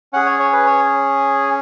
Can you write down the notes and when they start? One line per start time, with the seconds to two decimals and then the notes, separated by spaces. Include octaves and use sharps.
0.13 C#4 G#4 F#5
0.26 C#5
0.40 C#5
0.53 B4
0.67 C#5